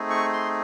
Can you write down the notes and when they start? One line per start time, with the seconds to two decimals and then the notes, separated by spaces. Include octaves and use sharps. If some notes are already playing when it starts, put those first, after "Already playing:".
Already playing: A3 C4 D#4 G#4
0.10 C#6
0.33 C6